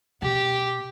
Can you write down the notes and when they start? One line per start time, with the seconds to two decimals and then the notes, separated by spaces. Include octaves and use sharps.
0.22 B2 G4